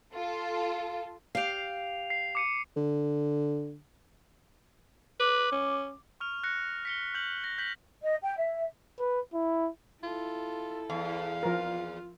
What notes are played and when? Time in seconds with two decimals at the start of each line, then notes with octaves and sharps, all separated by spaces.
0.14 F4 A4
1.35 G4 F5 C7 F7
2.10 C7
2.35 D6 C#7 D#7
2.76 D3
5.20 B4 D6
5.52 C#4
6.20 C#6 F6 F7
6.43 F#6 A#6 C#7
6.85 B6 C#7 G7
7.14 F6 G6 F7 F#7
7.44 A#6 C#7
7.58 G6 B6 F#7
8.03 D#5
8.22 G5
8.37 E5
8.99 B4
9.34 E4
10.03 E4 F4 A4
10.90 E2 F5
11.43 F3 F4 A#4